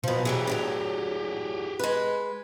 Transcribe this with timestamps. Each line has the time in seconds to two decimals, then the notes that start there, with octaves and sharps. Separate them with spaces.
0.04 B1 B2 F3
0.25 E3 F#3 G3 G4 G#4
0.47 A2 D3 F#3
1.79 G#3 B4